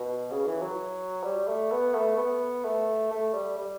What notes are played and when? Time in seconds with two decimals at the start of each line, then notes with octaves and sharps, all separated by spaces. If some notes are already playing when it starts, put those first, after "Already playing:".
Already playing: B2
0.31 C#3
0.47 E3
0.62 F#3
1.24 G3
1.48 A3
1.71 B3
1.94 A3
2.18 B3
2.64 A3
3.11 A3
3.34 G3
3.58 G3